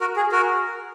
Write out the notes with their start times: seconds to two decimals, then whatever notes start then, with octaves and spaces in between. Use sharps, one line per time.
0.01 F#4 A#4
0.16 G#4
0.32 F#4 A#4